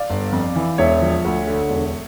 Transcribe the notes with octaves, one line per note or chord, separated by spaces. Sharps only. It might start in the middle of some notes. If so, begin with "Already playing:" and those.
Already playing: D5 F5
G1
F2
E3
E1 C#5 E5
F3
D2
D3
E1